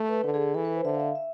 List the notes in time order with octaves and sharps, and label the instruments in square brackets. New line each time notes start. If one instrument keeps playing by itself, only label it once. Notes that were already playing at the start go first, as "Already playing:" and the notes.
Already playing: [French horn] A3
[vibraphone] B4
[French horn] D3 [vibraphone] A4
[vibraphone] G#4
[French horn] E3 [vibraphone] A4
[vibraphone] B4
C5
[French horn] D3 [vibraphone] E5
[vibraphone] F5
E5
E5